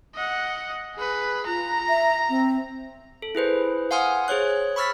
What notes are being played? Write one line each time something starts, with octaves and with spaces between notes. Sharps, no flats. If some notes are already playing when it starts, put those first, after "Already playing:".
D#5 F#5
G#4 B4
F4 A#5
E5
C4
A4
E4 G#4 B4 C5
F5 F#5 G#5 C6 D#6 F6
G#4 C5 C#5 F#6
B5 C#6 E6 F6 A6 B6